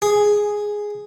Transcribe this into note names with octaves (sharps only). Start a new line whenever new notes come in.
G#4